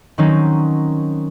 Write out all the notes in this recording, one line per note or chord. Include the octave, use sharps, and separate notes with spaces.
D#3 F#3 C4 C#4 D#4